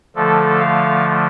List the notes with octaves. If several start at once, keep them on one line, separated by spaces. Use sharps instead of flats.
D3 F3 A3 A4
F5